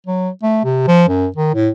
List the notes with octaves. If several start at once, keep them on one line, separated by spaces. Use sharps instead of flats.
F#3
A3
C3
F3
F#2
D#3
A2